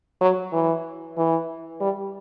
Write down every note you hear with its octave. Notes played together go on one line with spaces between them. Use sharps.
F#3
E3
E3
G3